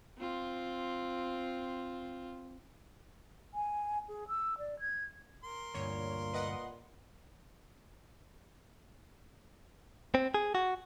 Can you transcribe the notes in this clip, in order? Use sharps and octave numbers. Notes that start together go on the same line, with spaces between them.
C4 F4
G#5
G#4
E6
D5
G#6
A#4 C6
D2 G2 A#2 C#5
B4 D#5 F#5
C4
G#4
F#4